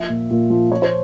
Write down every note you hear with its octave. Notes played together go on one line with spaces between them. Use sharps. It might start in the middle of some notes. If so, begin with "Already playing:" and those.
Already playing: F3 E5
A#2
A#2
F3
F3 C#5
C5